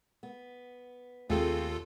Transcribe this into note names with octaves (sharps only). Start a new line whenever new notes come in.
B3
D#2 A3 C4 F4 G#4 A4